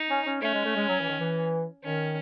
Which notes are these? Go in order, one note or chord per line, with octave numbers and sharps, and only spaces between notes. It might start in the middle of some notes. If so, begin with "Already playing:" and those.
Already playing: D#4
C#4
C#4
A3 C#4
G#3
A3
G#3
F#3
E3
D#3
E3
D#3 C#4